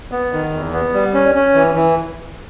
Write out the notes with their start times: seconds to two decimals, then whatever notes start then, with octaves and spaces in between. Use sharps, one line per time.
0.12 B3
0.33 D#3
0.52 E2
0.73 B3
0.94 G3
1.14 C#4
1.35 C#4
1.55 E3
1.75 E3